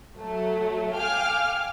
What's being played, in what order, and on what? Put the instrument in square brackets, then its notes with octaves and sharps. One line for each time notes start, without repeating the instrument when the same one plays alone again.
[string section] F#3 A3
F5 G5 G#5 D6 F6